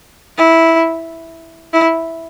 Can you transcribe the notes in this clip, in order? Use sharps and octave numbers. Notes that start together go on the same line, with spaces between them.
E4
E4